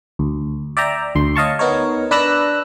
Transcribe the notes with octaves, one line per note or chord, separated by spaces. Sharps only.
D2
D5 E5 G5 A#5
D2 C6
C#5 D#5 F5 A5 C#6
B3 D#4 A#4 C#5
D4 B4 D5 E6 F#6 A#6